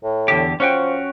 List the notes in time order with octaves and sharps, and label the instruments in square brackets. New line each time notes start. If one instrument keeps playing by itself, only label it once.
[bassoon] A2
[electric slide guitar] E2 D3 G4
[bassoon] F3 [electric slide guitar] C#4 F#4 G5